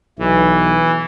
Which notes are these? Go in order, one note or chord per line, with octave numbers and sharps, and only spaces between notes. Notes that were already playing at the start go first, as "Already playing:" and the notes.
B1 E3